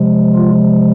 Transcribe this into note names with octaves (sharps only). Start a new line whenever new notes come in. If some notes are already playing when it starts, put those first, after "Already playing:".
Already playing: C3 F3 G#3
F4